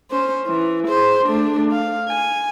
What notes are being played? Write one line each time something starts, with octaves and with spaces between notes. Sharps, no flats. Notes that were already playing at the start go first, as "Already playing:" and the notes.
C#4 C5
E3
G#4 C5
A3 D4
F5
G#5